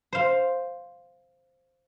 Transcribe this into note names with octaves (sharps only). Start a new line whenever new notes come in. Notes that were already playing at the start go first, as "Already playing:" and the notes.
C5 F5